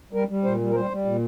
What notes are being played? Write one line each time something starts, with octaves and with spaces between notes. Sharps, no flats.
G3 A#4
G3
A#2 C5
G3
A#4
G3 C5
G3
A#2